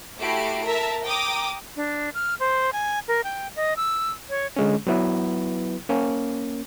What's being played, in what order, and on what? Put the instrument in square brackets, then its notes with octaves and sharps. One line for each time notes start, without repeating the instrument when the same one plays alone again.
[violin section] A3 E4 F#4 G4 C7 D7
A#4 E5 A5
G5 A#5 D6 D#6
[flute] D4
F6
C5
G#5
A#4
G5
D#5
E6
C#5
[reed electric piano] D3 G#3 C#4
F#3 B3 E4 B4
A#3 C#4